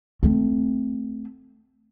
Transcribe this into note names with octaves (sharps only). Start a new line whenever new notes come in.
A3 C4